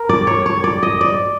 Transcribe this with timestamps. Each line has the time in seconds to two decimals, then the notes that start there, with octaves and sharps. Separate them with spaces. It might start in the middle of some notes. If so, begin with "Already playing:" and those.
Already playing: A#4
0.09 D5
0.27 C#5
0.46 C#5
0.64 D5
0.83 D#5
1.01 D5